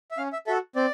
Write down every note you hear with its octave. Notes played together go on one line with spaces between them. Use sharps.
E5
C#4 F5
E5
F#4 A4 E5
C4 D5